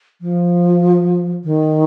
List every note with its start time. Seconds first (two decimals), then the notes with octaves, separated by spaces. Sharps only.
0.21 F3
1.44 D#3